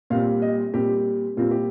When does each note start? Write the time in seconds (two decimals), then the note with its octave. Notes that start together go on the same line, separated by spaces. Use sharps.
0.10 A#2 G3 C4 F5
0.42 D#5
0.74 A#2 G3 C4 G4
1.37 A#2 G3 C4 F4
1.51 G4